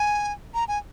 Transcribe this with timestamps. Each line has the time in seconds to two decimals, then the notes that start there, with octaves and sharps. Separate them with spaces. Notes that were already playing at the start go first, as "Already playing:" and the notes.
Already playing: G#5
0.54 A#5
0.68 G#5